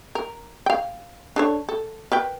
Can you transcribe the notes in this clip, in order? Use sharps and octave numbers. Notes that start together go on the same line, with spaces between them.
A#4
F5 G5
D4 A4 C#5
A4
A#4 B4 G5